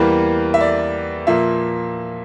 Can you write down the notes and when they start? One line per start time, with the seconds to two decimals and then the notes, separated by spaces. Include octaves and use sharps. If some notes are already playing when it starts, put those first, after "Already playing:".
Already playing: E2 E3 G3 A#3
0.54 E5
0.61 D5
1.27 A#2 F3 A#3 E5